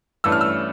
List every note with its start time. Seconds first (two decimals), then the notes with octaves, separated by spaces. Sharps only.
0.24 G2 E3 A3 C#4 E6
0.32 F6
0.41 E6